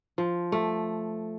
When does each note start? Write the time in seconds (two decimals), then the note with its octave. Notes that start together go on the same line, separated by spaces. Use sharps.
0.18 F3
0.52 A3